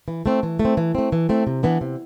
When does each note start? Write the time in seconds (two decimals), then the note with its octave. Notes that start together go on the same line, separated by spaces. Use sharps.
0.08 E3
0.26 A3 C4
0.43 E3
0.59 A3
0.65 C4
0.77 E3
0.95 A3 C4
1.12 E3
1.29 A3 C4
1.47 C3
1.63 E3 B3 D4
1.81 C3